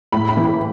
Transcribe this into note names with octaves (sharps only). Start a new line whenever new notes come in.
A2 B5
B5
E3
B5